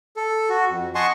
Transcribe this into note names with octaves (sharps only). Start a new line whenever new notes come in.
A4
F#4
F2
D#5 F#5 G#5 A5 C6 C#6